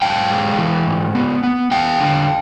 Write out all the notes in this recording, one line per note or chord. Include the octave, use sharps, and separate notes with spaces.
G#2 F5 G5
G#3
E3
G#2
B3
B3
B3 F5 G5
D3